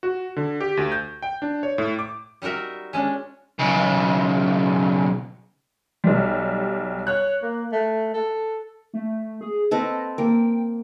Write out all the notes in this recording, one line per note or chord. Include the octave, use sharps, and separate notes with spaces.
F#4
D3
G4
D2
G6
G5
D4
C#5
A2
D6
G3 D#4 F#4 A#4 E5
G#3 C#4 D4
B1 C#3
B1 G3
C#5 F#6
A#3
A3
A4
A3
G#4
C4 A4 B4 D#5
A#3 G5